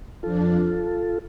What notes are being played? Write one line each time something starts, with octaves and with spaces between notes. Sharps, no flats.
F2 F3 D4 F4 A4